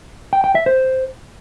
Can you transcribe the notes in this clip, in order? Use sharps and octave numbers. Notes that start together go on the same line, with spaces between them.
G5
G5
E5
C5